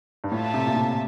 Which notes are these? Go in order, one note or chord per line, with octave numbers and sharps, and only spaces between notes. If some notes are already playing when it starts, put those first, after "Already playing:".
G2
A2 F4 A4 E5 A5
C3
A#2
C3